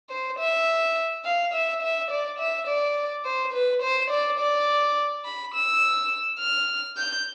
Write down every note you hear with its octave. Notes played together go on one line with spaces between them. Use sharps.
C5
E5
F5
E5
E5
D5
E5
D5
C5
B4
C5
D5
D5
B5
E6
F6
G6